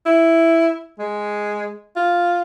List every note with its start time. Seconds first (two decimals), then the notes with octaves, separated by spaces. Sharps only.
0.06 E4
0.99 G#3
1.96 F4